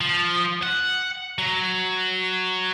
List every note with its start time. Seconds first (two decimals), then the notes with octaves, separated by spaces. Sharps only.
0.01 F3
0.63 F#5
1.38 F#3